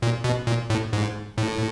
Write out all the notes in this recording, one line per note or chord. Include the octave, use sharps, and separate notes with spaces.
A#2
B2
A#2
A2
G#2
A2